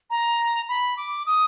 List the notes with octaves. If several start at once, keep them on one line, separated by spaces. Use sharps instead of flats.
A#5
B5
D6
D#6